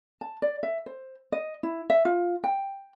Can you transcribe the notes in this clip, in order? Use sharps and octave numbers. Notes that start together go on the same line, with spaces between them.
A5
D5
E5
C5
D#5
E4
E5
F4
G5